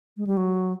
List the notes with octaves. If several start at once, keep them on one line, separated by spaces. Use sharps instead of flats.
G#3
G3
F#3